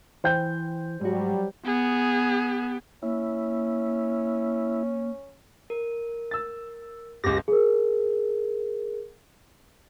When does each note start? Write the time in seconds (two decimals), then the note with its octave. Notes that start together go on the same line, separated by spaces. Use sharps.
0.24 E3 C5 G5 G6
1.01 G#2 F#3 G3 F#4
1.66 B3 G#4
3.03 A#3 C#4 E4
5.70 A#4
6.31 E6 A6
7.24 G1 C#2 G4 A#6
7.48 G#4 A#4